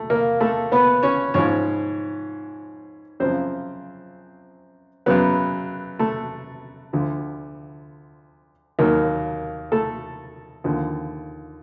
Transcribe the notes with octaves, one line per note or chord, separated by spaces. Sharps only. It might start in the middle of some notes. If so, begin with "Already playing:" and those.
Already playing: A3
A#3 A#4
A3 A4
B3 B4
C#4 C#5
G#2 F3 C#4 C#5
F#2 C#3 F3 C4 C5
F#2 C#3 F#3 B3 B4
A3 A4
D2 D3 F3
D#2 D#3 F#3 A#3 A#4
A3 A4
D#2 D3 F3